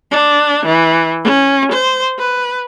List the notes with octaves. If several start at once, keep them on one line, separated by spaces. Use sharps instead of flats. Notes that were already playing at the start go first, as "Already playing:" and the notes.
D4
E3
C#4
C5
B4